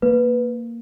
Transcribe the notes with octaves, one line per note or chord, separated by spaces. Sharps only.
A#3 B4